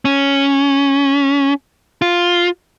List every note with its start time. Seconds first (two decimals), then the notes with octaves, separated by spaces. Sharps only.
0.05 C#4
2.02 F4